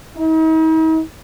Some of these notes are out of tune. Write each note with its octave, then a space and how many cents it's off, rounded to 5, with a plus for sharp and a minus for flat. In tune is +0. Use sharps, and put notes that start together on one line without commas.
D#4 +45